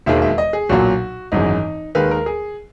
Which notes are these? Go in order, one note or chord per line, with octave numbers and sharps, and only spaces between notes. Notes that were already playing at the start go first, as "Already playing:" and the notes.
E1 D#2 D#3 G#3 E5
E5
D#5
G#4
B1 A#2 F#3 F#4
G#1 F#2 E3 G#3 D#4
D#2 D#3 G#3 B4
A#4
G#4